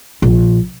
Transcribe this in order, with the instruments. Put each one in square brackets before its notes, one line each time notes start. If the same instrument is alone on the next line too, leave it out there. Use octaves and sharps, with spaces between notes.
[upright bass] A#1